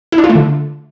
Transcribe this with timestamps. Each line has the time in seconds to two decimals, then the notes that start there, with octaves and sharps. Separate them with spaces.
0.12 E4
0.18 D4
0.24 F4
0.29 A3
0.35 D3